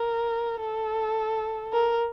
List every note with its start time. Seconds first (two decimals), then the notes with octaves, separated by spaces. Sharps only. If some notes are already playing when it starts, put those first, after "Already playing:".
Already playing: A#4
0.61 A4
1.73 A#4